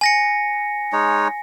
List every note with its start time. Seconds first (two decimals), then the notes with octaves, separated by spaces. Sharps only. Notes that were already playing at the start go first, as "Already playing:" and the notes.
0.01 G#5 A#6 C#7
0.93 G#3 D#4 C#5